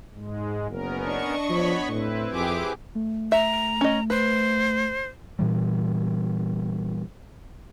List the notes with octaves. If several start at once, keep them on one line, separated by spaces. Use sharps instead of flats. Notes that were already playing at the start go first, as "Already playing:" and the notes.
G#2 G#3
F#1 B3 C#4 A#4
D4 D#5 C#6
F3 B3 C#5 B5
A2 C4 E4 B4
F2 G4 G#4 D6
A3
E5 A#5
C#4 D#5
B4 C5
A#2 E3 G3